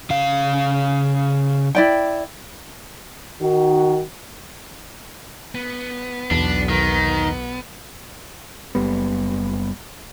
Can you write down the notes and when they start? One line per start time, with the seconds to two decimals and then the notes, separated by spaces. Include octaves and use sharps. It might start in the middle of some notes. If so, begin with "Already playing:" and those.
0.10 C#3 F5
1.75 E4 D5 G5
3.41 D#3 F#4
5.55 B3
6.31 B1 E2 D4
6.69 D#3
8.75 F#1 G3 B3